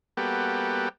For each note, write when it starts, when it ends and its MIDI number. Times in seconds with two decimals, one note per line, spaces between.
0.17 0.89 55
0.17 0.89 58
0.17 0.89 59
0.17 0.89 66
0.17 0.89 67
0.17 0.89 69